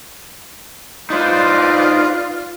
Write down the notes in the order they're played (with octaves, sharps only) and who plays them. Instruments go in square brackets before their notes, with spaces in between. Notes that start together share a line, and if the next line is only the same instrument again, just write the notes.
[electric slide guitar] D#4 C5 [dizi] F4 [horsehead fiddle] B4 D5